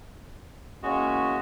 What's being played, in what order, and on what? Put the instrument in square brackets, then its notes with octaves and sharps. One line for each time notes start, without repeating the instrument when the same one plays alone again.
[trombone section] E2 A#3 C#4 [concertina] G#3 F#4